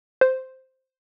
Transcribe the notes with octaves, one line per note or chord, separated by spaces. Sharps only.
C5